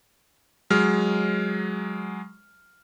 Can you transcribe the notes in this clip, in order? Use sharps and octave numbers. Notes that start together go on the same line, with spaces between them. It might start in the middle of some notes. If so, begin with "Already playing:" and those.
F#3 G#3 F6